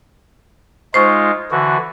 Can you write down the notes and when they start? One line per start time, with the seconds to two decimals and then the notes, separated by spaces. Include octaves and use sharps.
0.94 G#3 D#4 F4 C5 C#6
1.51 D3 E3 F#4